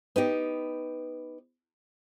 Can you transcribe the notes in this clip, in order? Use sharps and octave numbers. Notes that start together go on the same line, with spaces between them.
B3 D#4 G4